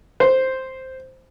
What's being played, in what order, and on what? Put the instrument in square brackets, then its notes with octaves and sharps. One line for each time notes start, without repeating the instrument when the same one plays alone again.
[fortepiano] C5